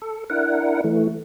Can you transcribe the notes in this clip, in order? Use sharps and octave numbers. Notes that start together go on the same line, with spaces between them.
A4
D4 E4 A#4 F#5
E3 A3